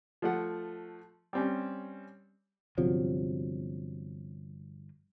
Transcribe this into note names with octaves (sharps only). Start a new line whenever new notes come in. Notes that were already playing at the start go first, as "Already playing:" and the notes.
F3 A3 F#5
G3 C4 C#4
G1 C3 F3 F#3